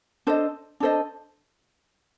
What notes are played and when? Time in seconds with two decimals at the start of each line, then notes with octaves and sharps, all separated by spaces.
0.27 D4 A4 C5 D#5
0.80 D4 A4 C5 D#5